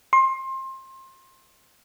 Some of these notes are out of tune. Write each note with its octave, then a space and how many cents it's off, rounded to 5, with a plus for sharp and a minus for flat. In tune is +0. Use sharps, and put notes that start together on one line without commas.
C6 +25